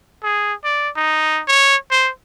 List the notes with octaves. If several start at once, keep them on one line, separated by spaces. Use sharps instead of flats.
G#4
D5
D#4
C#5
C5